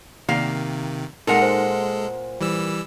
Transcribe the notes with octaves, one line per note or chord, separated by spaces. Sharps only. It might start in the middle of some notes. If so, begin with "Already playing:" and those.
C3 D#3 A#3 F5
A#2 G#3 D#4 A4 A#4 F#5
C5
E3 G3 E6